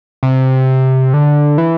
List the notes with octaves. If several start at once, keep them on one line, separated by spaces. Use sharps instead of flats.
C3
D3
E3